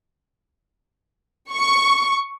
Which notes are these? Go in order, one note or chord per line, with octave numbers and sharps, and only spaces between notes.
C#6